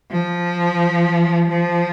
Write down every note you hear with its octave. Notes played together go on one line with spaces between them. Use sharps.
F3
F3